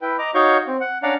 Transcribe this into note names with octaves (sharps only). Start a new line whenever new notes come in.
E4 B4 G5
D#5 A#5 D6
D#4 F#4 C#5 F5 C#6 G6
C4
F#5
C#4 D4 D5 F5 F#5 A#5